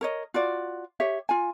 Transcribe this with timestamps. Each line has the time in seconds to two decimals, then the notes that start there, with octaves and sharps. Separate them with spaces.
0.01 A#4 C#5 D#5
0.34 F4 F#4 D5
1.00 G4 C#5 E5
1.29 F4 G#5